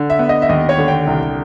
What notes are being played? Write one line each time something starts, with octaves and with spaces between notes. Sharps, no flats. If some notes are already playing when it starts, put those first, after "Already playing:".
Already playing: D3
E5
B3
D#5
E5
D#2 D#5
C#5
D3
G5
C2